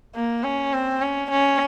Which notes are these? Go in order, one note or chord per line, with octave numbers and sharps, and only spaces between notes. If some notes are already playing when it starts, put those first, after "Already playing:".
A#3
C#4
C4
C#4
C#4